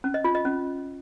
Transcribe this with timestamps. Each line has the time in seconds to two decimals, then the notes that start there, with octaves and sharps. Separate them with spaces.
0.04 C#4
0.14 D#5
0.24 F4
0.35 D#5
0.45 C#4